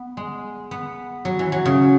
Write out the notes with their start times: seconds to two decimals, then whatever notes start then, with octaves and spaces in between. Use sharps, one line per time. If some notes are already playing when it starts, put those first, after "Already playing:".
Already playing: B3
0.17 G#3
0.71 B3
1.25 F#3
1.39 E3
1.52 F#3
1.65 C#3